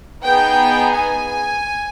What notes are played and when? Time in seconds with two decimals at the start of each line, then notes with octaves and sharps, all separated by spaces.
0.23 B3 D#4 G#4 G5
0.94 G#5